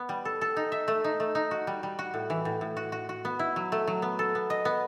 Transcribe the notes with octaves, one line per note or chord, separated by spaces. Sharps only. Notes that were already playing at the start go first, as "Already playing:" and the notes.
Already playing: B3
G3
A4
A4
D#4
E5
A3
D#4
A3
D#4
F#4
G3
G3
F#4
A2
E3
A2
A2
F#4
F#4
F#4
B3
E4
F#3
A3
F#3
B3
A4
B3
D#5
B3